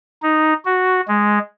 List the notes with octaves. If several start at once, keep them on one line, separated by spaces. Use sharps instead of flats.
D#4
F#4
G#3